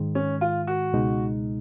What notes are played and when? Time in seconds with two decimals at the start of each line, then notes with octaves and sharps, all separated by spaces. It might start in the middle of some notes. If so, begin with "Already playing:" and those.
Already playing: G#2 D#3 G#3
0.15 C#4
0.41 F4
0.67 F#4
0.93 C#2 B2 G#3 D#4